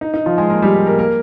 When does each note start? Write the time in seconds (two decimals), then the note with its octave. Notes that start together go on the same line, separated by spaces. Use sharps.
0.01 D#4
0.14 D#4
0.26 F3 F4
0.38 G#3 G#4
0.50 A#3 A#4
0.62 G3 G4
0.86 A#3 A#4
0.99 A#3 A#4